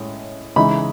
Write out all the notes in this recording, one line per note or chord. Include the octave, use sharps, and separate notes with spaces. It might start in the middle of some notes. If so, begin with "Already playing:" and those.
Already playing: A2 G#3 C#4
C#3 E3 G#3 D#4 B5